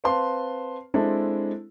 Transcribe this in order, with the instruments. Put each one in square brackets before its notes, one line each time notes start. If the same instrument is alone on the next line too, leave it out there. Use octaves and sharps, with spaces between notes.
[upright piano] C4 B4 F5 A5 C6
G#3 C4 D4 E4 A4